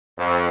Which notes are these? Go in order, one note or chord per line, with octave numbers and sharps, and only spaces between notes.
F2